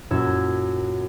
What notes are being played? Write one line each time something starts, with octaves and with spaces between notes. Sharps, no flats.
F#2 A#2 E4 F#4 E6 G#6